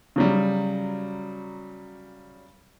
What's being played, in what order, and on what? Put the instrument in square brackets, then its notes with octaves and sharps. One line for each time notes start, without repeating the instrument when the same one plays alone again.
[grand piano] C#3 F#3 G3